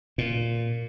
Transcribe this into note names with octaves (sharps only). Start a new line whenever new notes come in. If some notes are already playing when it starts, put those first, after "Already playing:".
A#2